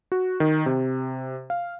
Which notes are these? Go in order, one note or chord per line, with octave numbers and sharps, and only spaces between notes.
F#4
D#3
C3
F5